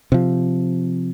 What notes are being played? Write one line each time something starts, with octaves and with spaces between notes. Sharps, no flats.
C3 F3